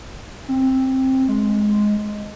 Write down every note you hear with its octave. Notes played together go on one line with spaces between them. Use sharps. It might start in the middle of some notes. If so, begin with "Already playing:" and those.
C4
G#3